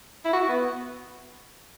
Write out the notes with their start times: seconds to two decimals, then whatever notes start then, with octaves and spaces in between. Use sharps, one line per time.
0.25 E4
0.33 F#4
0.49 B3